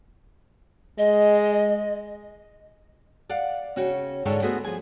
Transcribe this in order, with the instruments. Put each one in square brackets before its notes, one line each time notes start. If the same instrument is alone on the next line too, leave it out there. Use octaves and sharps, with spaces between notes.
[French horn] G#3 [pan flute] D#5
[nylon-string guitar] D5 F5 F#5
C#3 C#4 F#4 G5
G#2 D3 G#4 A4 C#5 G5
A3 B3 F#4 G#4 C5 D#5
F3 G#4 G#5